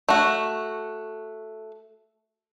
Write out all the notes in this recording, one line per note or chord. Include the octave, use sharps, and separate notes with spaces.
A3 F#4